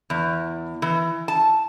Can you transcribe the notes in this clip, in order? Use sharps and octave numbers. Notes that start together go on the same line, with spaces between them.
E2
E3
A5